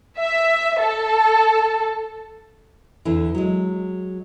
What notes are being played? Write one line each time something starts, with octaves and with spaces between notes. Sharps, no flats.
E5
A4
E2 D3 E3
F#3 G#3